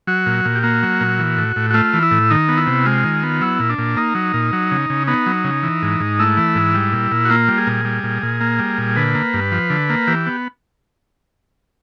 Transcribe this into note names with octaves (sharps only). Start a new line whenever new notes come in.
F#3 F#4
A#2
A#2
G4
A#3 F#4
F#3
A#2
E3
A2
A2
F#4
A3 F4
E3
E4
A2
D#3 D#4
B3
E4
C3
G#3 F4
D#3
B3
F#3 E4
A#2
D4
A#2
A#3 D#4
F#3
A#2
F#3
C#3
C#3
B3 D#4
F#3
C#3
E3
G#2
G#2
A3 E4
E3
G#2
G3
A#2
A#2
F#4
A#3 F4
G3
G#4
A#2
G3
A#2
A#2
A#3
G3
A#2
D3 B4
A#3
G2
F3
D3
A#3
E3 G4
B3